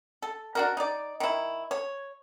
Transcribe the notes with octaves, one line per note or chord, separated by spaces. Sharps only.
A4
D4 F#4 A#4
D#4 D5
D#3 E4
C#5